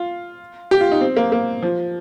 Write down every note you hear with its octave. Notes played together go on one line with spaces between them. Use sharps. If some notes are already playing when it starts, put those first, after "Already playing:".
Already playing: F4
G4
F4
D#4
C4
A#3
A#3
F3